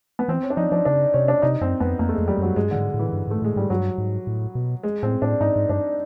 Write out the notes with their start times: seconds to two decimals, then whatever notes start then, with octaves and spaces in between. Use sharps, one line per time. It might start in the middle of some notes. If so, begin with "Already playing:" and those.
0.19 B3
0.28 E3 C4
0.43 C#4
0.50 D4
0.57 F3 D#4
0.71 F3 D4
0.85 C#3 D4
1.14 C3 C#4
1.28 D4
1.42 C3 D#4
1.61 F#2 C4
1.80 F2 B3
1.99 F2 A#3
2.09 A3
2.14 F2 G#3
2.28 G3
2.38 F#2 F#3
2.56 G2 G#3
2.71 G#2 D3
2.94 A2
2.99 E3
3.13 G2
3.27 G#2 A3
3.42 A2 G#3
3.56 G#2 G3
3.70 G2 F#3
3.98 G#2
4.27 A2
4.55 B2
4.83 G#3
5.03 A2 C4
5.22 A2 D4
5.40 G#2 D#4
5.56 G#2
5.69 G2 D4